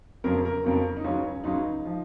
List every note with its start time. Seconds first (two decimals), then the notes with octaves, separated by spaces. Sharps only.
0.24 F2 C#3 F#3 A#4
0.45 A#4
0.64 F2 C#3 F#3
0.97 D#4
1.04 C#2 C#3 F#3 C#4
1.44 C#2 C#3 F#3 D#4
1.85 F3